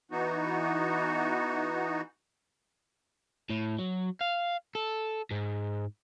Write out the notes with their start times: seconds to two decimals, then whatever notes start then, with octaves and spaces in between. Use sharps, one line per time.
0.11 E3 B3 D#4 F#4
3.50 A2
3.79 F#3
4.21 F5
4.75 A4
5.31 G#2